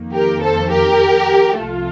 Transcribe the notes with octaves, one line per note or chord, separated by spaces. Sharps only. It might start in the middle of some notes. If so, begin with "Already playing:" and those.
Already playing: F2 D#3 A#3
G4 A#4
A4 C5
G4 A#4
C2 C3 F3 A3 F4 A4